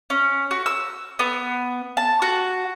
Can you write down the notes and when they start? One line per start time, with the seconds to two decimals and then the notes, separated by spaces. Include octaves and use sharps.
0.10 C#4
0.51 F#4
0.66 E6
1.19 B3
1.97 A5
2.22 F#4